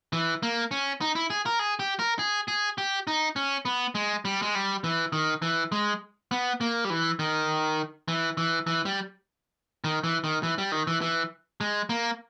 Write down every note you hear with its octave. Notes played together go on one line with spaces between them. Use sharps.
E3
A#3
C#4
D#4
E4
G#4
A#4
G#4
G4
A#4
G#4
G#4
G4
D#4
C#4
B3
G#3
G3
G#3
G3
E3
D#3
E3
G#3
B3
A#3
G3
E3
D#3
E3
E3
E3
G3
D#3
E3
D#3
E3
G3
D#3
E3
E3
G#3
A#3